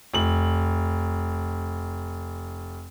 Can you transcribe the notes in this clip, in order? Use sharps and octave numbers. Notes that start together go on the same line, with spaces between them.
F1 F#7